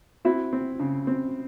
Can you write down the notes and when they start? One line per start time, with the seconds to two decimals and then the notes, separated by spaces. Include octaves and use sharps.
0.25 C4 E4 F#4
0.53 C4
0.80 C#3
1.07 C4